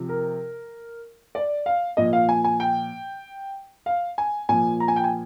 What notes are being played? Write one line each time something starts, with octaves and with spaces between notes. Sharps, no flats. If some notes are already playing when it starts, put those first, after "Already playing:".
Already playing: C3 F3
A#4
D5
F5
A#2 F3 D#5
F5
G#5
G#5
G5
F5
G#5
A#2 F3 G#5
A#5
G#5
G5
G#5